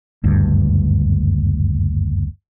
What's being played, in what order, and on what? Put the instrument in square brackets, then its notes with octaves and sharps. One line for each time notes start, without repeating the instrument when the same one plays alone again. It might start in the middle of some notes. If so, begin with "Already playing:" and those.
[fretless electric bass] F#1 D2 G2